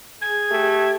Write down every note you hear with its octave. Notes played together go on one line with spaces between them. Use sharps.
G#4 G#6
A3 G4 A4